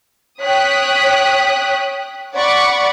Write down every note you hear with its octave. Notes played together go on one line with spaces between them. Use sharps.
C#5 G5 D#6 F#6 B6
D5 F#5 B5 C#6